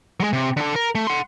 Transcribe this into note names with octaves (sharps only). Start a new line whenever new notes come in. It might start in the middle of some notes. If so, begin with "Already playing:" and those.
F#3 G#3
C3
D3 A4
A#4
A3
F#5 C6